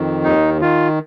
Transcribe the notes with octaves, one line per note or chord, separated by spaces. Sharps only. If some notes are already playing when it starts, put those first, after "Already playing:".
Already playing: F2 D#3
D#2 D#4
D#3 F4